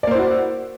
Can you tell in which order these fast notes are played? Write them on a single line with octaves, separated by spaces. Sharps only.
D5 A#3 C5 E4 F#4